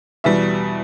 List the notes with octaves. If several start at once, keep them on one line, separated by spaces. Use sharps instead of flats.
E2 B2 G3 E5